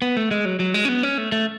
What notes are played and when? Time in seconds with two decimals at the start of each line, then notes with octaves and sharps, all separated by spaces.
0.02 B3
0.17 A3
0.31 G#3
0.45 F#3
0.60 F#3
0.74 G#3
0.85 C#4
0.89 B3
1.03 C#4
1.18 A3
1.32 A3